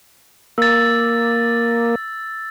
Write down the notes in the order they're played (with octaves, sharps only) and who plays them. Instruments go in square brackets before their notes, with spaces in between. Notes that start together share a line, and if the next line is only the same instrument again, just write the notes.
[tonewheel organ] A#3 [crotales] E6 A6